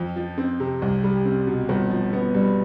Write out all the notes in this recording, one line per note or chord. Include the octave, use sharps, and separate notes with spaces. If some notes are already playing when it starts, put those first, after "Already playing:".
Already playing: F2
F3
C4
C3
C2
G3
C4
B2
G1
F3
B3
G2